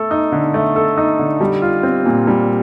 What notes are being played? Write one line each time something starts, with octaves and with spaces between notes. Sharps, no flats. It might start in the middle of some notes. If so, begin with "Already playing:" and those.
Already playing: A3 A4
D#4
D3
A3
A4
D#4
D3
G3
F4
C4
A#2
G3